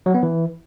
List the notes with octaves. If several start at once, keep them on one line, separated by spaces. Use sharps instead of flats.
F#3
B3
E3